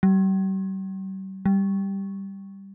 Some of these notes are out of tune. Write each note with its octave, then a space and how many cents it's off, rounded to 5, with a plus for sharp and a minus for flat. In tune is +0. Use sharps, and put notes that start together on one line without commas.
G3 -40
G3 +0